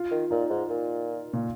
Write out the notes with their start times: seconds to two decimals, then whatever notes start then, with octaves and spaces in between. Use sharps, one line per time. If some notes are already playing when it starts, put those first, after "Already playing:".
Already playing: F4
0.11 D#3
0.31 A#2 D#4
0.50 G#2
0.69 A#2
1.33 A#2